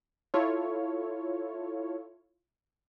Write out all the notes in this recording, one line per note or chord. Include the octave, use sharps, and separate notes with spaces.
E4 F4 A4 C#5